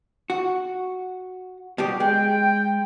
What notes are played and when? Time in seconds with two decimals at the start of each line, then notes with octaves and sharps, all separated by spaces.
0.30 F#4
1.78 B2 G3 G4
2.00 G#3 G5